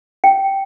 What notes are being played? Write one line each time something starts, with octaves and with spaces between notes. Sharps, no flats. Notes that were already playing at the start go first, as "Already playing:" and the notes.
G5